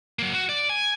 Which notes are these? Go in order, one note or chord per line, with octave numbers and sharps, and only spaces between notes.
F#3 A#3
F#4
D5
G#5